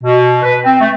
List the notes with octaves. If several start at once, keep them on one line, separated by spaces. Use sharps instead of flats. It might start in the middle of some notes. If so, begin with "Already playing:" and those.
B2
B4
C4
A3